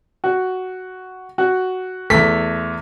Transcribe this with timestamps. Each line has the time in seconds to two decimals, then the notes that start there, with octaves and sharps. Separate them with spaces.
0.24 F#4
1.38 F#4
2.10 E2 A3 B6